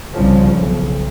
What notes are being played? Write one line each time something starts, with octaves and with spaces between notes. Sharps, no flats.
C2 C#3 F3
B1